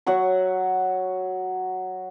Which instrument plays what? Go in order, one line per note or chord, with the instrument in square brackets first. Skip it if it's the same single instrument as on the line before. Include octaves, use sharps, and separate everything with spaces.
[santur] F#3 E5 F#5 C#6